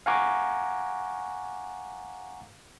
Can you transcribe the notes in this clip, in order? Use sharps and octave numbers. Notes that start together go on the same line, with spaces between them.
F5 F#5 G#5 A#5 C#6 D6